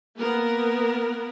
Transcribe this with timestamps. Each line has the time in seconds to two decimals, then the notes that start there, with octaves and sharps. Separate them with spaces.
0.16 A#3 B3 A#4